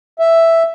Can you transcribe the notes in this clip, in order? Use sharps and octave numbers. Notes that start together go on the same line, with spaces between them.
E5